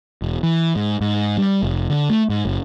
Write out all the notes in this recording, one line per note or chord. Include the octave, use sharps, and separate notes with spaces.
E1
E3
G#2
G#2
G3
F1
D3
A3
G#2
F#1